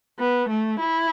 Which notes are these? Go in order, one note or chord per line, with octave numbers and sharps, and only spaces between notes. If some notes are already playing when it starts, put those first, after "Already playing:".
B3
A3
E4